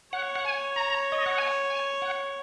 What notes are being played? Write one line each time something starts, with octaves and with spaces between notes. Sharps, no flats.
C#5 F#5
F#5
G#5
A#5
D#5
F#5
G#5
G#5
F#5